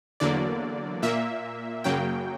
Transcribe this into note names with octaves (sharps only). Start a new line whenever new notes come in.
E2 D3 F#3 A#3 D5
A#2 A#3 E5
F#2 C#3 F#3 A#3 G5